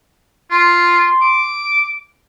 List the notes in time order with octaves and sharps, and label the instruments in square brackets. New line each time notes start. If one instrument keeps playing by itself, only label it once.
[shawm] F4 [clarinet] C6
[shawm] D6